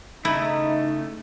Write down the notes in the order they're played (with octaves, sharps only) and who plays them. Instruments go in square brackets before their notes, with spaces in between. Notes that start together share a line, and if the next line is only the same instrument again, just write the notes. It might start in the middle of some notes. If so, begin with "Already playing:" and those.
[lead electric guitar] C#3 A3 [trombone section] D#4 [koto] E4